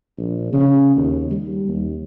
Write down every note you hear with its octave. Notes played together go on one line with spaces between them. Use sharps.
A#1
C#3
D#2
G3
D#2